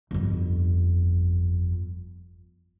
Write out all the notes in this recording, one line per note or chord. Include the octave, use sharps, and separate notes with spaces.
G1 F2